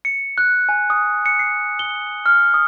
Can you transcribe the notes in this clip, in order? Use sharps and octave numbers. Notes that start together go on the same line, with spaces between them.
C#7
F#6
G#5
D#6
C#7
C7
G7
F6
D#6